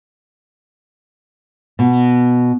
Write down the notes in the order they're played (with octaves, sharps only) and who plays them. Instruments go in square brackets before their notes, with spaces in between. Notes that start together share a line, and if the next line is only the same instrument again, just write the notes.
[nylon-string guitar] B2